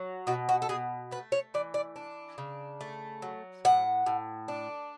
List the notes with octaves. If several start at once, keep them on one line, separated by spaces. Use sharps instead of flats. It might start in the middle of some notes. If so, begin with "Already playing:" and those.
Already playing: F#3
B2 F#4
F#4
A4
B2 G#4
A3 B4
C#5
E3 D5
D5
D4
C#3
A3
F#3
A2 F#5
A2
D4